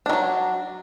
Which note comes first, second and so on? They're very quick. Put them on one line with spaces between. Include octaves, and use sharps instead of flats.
D4 D#3 F#3